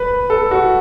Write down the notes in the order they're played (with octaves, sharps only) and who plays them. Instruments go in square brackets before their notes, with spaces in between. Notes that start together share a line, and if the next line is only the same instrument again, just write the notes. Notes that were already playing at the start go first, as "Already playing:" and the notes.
Already playing: [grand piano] B4
A4
F#4